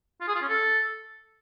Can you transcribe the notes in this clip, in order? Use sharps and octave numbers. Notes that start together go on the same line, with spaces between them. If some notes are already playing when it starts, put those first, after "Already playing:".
F4
G#4
F4
C#4
A4